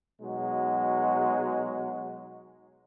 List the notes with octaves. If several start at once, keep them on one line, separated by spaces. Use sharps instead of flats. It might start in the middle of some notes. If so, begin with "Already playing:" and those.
B2 F#3 G#3 D#4 F#4